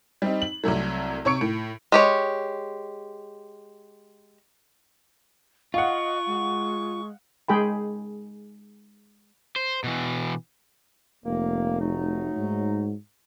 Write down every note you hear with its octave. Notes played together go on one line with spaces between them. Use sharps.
G3 C4 D#4
F#7
C2 C3 F#3 A3
C3 C#5 C#6 C#7 D7
A2
G#3 G4 C#5
F4 D#5 F5 F#5 C#6
G#3
G#3 G#4 G5 B5
C5
B2 E3
F1 A#3
F#3 A3 D#4
G#2